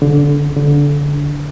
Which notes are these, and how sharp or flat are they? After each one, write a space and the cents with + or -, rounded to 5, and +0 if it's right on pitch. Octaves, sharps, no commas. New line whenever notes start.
D3 -20
D3 -20